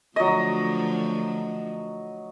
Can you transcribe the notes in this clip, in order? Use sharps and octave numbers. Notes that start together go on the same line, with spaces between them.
D3 F3 F#3 A3 D#5